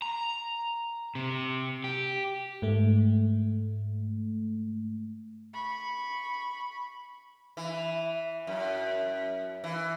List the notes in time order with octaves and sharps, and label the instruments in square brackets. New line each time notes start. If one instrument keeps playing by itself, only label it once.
[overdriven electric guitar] A#5
C3
G4
[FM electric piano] G#2 A3
[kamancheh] B5 C#6
[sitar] E3
F#2
E3